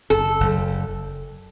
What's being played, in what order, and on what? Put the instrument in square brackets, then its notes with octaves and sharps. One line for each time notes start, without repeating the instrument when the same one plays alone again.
[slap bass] F#1 [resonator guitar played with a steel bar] A4
[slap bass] F#1